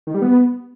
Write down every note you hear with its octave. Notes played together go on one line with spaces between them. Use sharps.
D#3
G3
B3